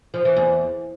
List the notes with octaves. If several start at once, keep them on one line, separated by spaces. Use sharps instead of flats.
F3
E3
E2